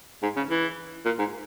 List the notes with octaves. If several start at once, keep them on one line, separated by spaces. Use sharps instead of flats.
G#2
C#3
E3
A#2
G#2